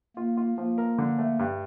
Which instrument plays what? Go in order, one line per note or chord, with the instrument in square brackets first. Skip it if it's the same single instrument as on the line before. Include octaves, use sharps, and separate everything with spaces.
[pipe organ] A#3 [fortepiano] F4
[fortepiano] F4
[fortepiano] F3 [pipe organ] A#3
[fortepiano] A#4
D3
A3
G2